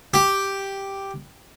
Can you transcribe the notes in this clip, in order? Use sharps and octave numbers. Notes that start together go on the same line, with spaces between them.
G4